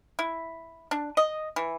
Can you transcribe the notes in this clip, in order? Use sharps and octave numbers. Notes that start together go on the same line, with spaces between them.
E4
D4
D#5
E3